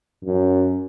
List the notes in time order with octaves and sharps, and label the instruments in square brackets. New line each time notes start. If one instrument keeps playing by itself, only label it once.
[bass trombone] F#2